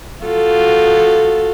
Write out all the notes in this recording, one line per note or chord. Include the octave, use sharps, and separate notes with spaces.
F4 F#4 A4